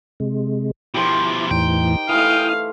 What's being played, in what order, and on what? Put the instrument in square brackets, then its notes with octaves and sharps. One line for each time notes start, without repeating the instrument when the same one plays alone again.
[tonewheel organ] C3 G#3
[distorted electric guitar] B2 F3 [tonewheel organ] E4 D6 [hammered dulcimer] G4 A#4 C5
[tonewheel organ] E2 A2 E3 [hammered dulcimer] D#4 [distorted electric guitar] G5
[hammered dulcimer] E3 A3 [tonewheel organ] E4 D#6 F6 [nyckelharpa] F5